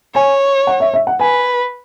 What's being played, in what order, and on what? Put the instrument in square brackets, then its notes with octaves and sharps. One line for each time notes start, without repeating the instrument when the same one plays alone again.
[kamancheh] C#5 [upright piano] G#5
[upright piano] F#5
E5
E5
F#5
[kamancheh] B4 [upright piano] G#5